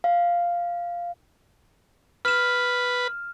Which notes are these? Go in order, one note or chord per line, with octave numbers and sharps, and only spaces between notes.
F5
B4 F6 E7